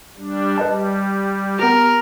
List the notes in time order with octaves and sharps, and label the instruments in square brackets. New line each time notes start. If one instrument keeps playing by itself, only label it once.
[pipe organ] G3 D4
[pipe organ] G3 [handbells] B4 D#5 A5
[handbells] B3 G4 [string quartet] A#4